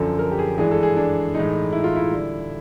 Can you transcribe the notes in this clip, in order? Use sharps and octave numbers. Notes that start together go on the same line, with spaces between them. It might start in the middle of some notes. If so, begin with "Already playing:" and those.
Already playing: F#2 D3 F3 A4
A#4
G4
G#4
G2 E3 G#3 G#4
A4
G#4
D4
A2 E3 G#3 D#4
E4
F4
E4
D3 G3